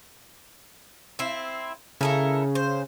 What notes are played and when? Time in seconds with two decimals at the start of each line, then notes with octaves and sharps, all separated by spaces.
1.19 C4 E4
2.01 C#3 E4 A4 A#4
2.55 C5